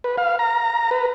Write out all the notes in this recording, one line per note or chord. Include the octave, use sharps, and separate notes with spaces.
B4
F5
A#5
B4